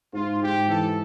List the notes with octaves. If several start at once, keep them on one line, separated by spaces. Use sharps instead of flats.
G#2 F4
G#2 G4
E3 A4